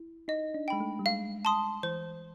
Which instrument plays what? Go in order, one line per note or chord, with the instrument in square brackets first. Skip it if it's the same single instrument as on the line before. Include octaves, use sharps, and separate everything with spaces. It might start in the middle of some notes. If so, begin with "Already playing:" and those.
Already playing: [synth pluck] E4
[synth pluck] D#4 [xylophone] D#5
[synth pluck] D4
[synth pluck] G#3 [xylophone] G5 B5
[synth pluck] A3
G3
[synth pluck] G#3 [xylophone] F5
[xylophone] A5 C6 D#6
[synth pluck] E3 [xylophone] C5